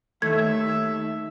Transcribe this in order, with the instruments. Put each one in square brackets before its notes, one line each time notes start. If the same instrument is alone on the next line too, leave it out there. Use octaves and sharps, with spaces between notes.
[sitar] D#2 [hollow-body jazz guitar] A3 [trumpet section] E5 [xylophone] G#6